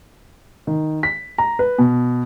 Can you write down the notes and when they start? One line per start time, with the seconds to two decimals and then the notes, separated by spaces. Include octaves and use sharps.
0.67 D#3
1.03 B6
1.38 A#5
1.59 B4
1.78 B2